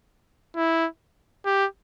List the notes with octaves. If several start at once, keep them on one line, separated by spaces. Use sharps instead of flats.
E4
G4